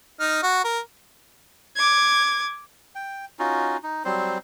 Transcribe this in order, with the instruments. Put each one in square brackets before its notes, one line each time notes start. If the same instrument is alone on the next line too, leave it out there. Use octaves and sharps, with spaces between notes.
[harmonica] D#4 F6
F#4
A#4
[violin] D6 G#6
[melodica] G5
C#4 D#4 F4 F#4
D#4
F#3 G3 C4 C5